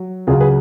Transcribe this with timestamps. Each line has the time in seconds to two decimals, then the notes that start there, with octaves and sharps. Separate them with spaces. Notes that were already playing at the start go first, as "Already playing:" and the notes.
Already playing: F#3
0.27 C#2 C#3 F#3 F4 G#4
0.41 G#4 B4